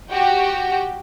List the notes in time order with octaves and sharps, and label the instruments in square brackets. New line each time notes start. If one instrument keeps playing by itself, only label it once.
[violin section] F#4 G4 G5